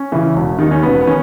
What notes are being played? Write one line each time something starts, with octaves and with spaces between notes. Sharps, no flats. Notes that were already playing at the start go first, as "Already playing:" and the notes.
Already playing: C#4
C#3 E3
E1
D#2 D#3 D#4
C#4
E1 B3
B3
D#3 C#4